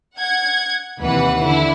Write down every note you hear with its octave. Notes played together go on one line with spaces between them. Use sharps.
F#5 G#6
D#2 C3 E3 B4 F#5
D3 E4